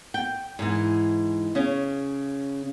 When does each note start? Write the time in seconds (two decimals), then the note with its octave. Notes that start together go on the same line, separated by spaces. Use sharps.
0.14 G5
0.59 G#2 E3
1.55 C#3 C#4